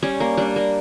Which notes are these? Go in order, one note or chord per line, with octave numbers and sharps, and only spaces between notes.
G3 C#4
A#3
G3 D4
A#3